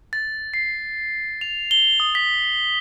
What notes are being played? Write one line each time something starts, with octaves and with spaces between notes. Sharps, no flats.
A6
C7
F7
G7
D#6
B6